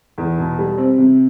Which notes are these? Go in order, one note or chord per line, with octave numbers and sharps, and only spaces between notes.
E2
B2
G3
C4
C3